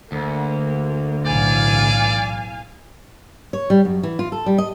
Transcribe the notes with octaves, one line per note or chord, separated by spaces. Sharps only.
D2 A#3
B1 A2 E3 D5 F5 G#5
C#5
G3
F#2
E3
F4
A4
G3
D#5